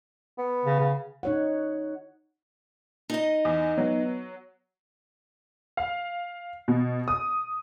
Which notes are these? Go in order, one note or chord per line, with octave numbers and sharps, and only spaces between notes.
B3
C#3
C#3
D#4 C#5 F#5
D#4 D#5
E2
F#3 B3 F#4
F5
B2
D#6